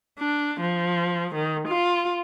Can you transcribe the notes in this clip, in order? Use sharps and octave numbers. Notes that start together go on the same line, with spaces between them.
D4
F3
D#3
F4